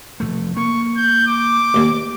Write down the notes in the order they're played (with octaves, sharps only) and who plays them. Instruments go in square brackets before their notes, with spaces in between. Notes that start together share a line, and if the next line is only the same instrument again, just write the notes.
[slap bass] F1 D#2 A3
[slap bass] A#3 [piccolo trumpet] C#6
[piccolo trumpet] G6
D6
[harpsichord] A1 D#2